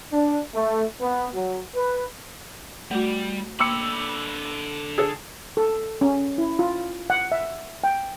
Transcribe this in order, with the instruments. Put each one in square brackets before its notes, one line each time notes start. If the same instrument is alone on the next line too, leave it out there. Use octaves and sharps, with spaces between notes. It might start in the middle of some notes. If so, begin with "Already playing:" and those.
[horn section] D4
A3
B3
F#3
B4
[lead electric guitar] G3 [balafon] A3 F#4
[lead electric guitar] D3 B5 [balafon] A#3 C6 [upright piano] D6 E6 C#7
[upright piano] G#4 A4
[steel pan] A4
C#4
E4
F4
F#5
E5
G5